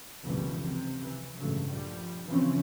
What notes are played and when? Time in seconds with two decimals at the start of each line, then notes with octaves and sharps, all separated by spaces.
0.24 F1 C#2 F#2 B2 E3 G3
0.67 C3
1.02 E3
1.38 A1 G2 C#3 F#3 G#3 A3
1.68 A#1 F3 G3
2.27 C#3 E3 F3 C4 C#4